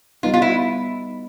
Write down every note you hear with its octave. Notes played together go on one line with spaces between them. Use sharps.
G3 B3 D#4 F4
F4
E4